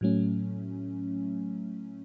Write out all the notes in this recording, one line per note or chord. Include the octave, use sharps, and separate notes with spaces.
A2 F#3 A3 C#4